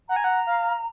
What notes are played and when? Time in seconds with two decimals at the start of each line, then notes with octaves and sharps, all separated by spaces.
0.09 F#5 A#5
0.16 G#5
0.24 F#5
0.47 F5